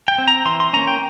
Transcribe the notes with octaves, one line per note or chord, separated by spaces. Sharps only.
G5
C4
A#5
E3 C6
C6
A#3 C#4 A#5
G5